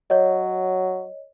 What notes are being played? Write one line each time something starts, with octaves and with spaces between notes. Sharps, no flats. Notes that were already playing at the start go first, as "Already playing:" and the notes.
F#3 C#5 D#5